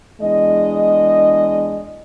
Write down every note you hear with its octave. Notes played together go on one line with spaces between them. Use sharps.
E2 G#3 D4 D#5